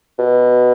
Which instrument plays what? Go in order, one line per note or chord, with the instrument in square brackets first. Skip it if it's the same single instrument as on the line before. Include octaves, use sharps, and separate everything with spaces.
[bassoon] B2